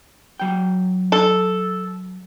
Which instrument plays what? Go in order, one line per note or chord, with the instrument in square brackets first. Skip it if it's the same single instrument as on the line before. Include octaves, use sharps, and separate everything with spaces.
[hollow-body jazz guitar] F#3 G5
[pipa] A4